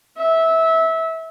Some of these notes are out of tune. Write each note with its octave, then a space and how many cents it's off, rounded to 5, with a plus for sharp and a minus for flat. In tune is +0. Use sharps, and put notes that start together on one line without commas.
E5 -20